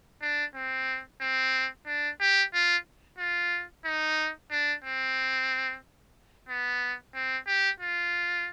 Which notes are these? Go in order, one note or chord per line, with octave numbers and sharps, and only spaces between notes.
D4
C4
C4
D4
G4
F4
F4
D#4
D4
C4
B3
C4
G4
F4